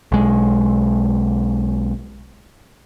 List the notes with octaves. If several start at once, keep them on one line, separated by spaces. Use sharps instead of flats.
B1 G#3